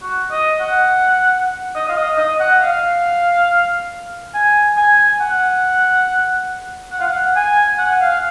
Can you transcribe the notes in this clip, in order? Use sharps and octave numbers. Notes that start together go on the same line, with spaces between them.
F#4
D#5
F#5
D#5
F5
D#5
D#5
F#5
F5
G#5
G#5
F#5
F#5
F5
F#5
G#5
F#5
F5